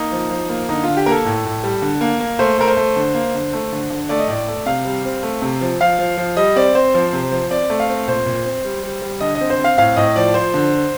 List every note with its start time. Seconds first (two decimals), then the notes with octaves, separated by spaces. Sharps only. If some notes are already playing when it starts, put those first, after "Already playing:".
Already playing: A#3 D#4
0.12 F3
0.30 F3
0.49 A#3
0.69 D3 D#4
0.83 D3 F4
0.97 G4
1.06 A#3 A#4
1.11 A4
1.25 A2
1.45 A2
1.64 G3
1.82 D3
2.01 A#3
2.20 A#3
2.39 A3 C5
2.58 A3 A#4
2.67 C5
2.77 A3
2.96 D3
3.14 A#3
3.34 D3
3.53 A3
3.72 D3
3.90 D3
4.09 A3 D5
4.19 D#5
4.28 A2 D5
4.48 A3
4.66 C3 F5
4.85 G3
5.05 C4
5.23 A3
5.42 C3
5.61 F3
5.81 F3 F5
5.99 F3
6.17 F3
6.37 G3 D#5
6.56 C4 D5
6.75 C4 C5
6.94 F3
7.13 C3
7.31 F3
7.51 C4 D5
7.70 A3
7.80 F5
7.89 C4
8.08 A#2 C5
8.26 A#2
8.45 C4
8.65 G3
8.83 G3
9.02 G3
9.21 D3 D#5
9.35 D#5
9.41 C4
9.50 C5
9.59 C4 F5
9.78 A2 F5
9.97 A2 D#5
10.16 F3 D5
10.34 F3 C5
10.54 D3